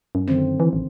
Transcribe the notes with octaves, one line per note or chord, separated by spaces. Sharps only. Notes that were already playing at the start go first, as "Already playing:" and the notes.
F#2
D3 D#3 C4
E3
A1